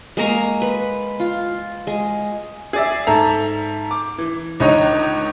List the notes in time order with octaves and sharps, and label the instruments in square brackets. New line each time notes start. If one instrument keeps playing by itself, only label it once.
[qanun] G#3 A#3 A#5 C#6
B4
F4
G#3
[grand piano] G#4 D5 E5
G#2 A4 E5 A#5
D6
E3
C#2 D3 D#4 C#5 D#5 A#5